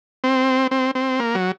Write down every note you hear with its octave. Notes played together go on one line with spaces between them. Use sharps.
C4
C4
C4
A#3
F#3